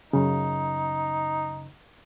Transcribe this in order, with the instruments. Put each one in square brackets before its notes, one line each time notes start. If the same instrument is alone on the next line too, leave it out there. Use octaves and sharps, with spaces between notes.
[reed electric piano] F#2 C#3 [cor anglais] D#4